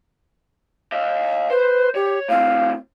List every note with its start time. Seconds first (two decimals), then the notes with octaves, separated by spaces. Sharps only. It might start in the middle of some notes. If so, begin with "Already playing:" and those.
0.92 D#5 F5
1.50 B4 C5
1.95 G4 C#5
2.29 A2 C4 F5